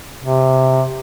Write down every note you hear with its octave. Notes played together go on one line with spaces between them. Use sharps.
C3